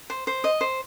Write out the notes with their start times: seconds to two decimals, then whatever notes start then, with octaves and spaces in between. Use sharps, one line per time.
0.10 C5
0.27 C5
0.44 D#5
0.61 C5